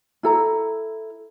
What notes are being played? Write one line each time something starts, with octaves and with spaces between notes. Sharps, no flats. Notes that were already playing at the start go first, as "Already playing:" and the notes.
E4 A4 A#5